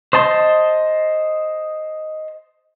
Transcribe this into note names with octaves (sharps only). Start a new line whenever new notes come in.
C5 D#5 A5 C6